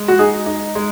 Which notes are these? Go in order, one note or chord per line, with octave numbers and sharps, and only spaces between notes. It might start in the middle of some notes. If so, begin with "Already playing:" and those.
Already playing: G#3
F#4
D#4 G#4
D#4
G#3